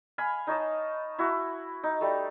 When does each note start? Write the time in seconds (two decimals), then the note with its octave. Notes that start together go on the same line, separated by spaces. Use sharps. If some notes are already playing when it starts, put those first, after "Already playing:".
0.18 F5 G#5 B5
0.47 D#4 C#5 D#5 A5
1.19 E4 F#4
1.83 D#4
2.01 G3 A3